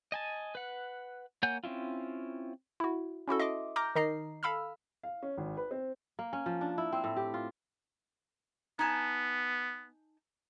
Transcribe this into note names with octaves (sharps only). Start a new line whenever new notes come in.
D#5 G#5 A5
B4 F#5
A#3 C#5 F#5 G#5 G6
C4 C#4 E4 F4
E4 F#4
C#4 E4 F#4 A4
D#5 E5 C6 D6
A#5 D6 F6 G6 A#6
D#3 D#4 D#5 A#5 C7
A4 F5 B5 E6 F6
F5
C#4
G#1
B4
C4
A#3
C#4
F3
D4
E4
C4
A2
G4
F4
B3 D#4 G#5 A5